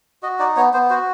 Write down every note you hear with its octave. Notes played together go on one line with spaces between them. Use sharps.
F#4 D#5
D#4 D5
B3 C#5
B3 C5
F#4 C5